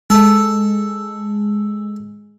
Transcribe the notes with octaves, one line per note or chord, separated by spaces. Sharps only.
G#3 A4